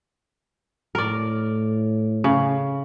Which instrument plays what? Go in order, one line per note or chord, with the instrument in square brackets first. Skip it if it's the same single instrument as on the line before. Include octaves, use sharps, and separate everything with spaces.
[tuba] A2 [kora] A#4 D5
[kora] C#3